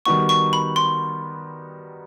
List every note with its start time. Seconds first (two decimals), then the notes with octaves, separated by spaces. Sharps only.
0.05 D#3 G3 B3 D#4 F#4 C#6
0.29 C#6
0.53 B5
0.76 C6